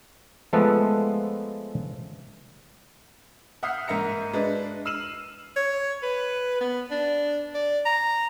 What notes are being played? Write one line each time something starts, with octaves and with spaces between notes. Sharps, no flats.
F3 G#3 A3 B3 A4 B4
E5 F#5 D#6 F6 G6 C7
G#2 A#3 E5 A#5 C#7
G#3 D4 B4
E6 F6 C7 D#7 E7 F#7
C#5
B4
B3
D4
D5
A#5